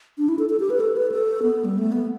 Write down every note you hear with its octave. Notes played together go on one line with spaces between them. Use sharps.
D4
E4
A4
A4
G4
B4
A4
B4
A4
B3
G3
A3
B3